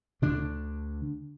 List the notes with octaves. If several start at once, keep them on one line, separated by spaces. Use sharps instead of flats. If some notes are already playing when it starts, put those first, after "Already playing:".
D2 D3 A3 D4